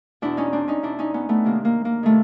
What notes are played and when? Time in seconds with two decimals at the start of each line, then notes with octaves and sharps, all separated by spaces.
0.22 E2 B2 D4 E4
0.37 C#4 D#4
0.53 C4 D4
0.68 C#4 D#4
0.83 E2 B2 D4 E4
0.99 C#4 D#4
1.14 B3 C#4
1.29 A3 B3
1.43 E2 C3 D#3 A#3
1.65 A#3
1.85 A#3
2.03 C3 D#3 A3